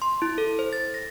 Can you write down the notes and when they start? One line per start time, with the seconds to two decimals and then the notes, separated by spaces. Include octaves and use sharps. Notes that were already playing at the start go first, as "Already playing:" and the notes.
0.02 C6
0.22 E4
0.38 A4
0.59 C5
0.73 A6
0.94 A#6